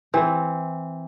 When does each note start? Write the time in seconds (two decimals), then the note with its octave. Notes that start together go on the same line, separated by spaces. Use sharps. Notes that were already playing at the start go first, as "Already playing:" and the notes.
0.14 E3 C4